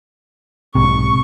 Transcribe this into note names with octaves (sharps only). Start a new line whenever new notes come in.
B1 G#2 C3 C#6